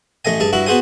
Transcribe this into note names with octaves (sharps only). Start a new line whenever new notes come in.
A1 A3 D#5 G#5
G2 G#4 A5
G2 E4 F#4
B3 F#4 G#4 C5 G#5